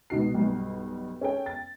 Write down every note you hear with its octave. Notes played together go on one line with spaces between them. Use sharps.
C#2 B2 D#4 F#4 C7
B1 G2
C#4 G#4 A4 G5
A6